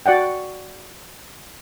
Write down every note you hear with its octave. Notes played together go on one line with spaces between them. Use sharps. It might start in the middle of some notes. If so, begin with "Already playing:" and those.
F#4 D5 F#5 G5